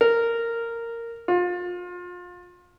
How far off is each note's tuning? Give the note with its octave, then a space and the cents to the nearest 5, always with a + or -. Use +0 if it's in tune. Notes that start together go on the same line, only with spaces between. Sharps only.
A#4 -10
F4 +30